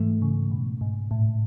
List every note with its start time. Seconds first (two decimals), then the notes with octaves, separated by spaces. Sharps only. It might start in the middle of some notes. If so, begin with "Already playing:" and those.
Already playing: G#2 E3 A3
0.22 C#3
0.51 B2
0.81 G#2
1.11 A2